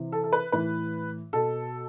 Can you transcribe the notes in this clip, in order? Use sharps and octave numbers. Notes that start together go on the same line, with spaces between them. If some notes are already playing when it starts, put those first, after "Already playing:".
Already playing: C3 E3
A4
A4
B4
A2 E3 B4
B2 A4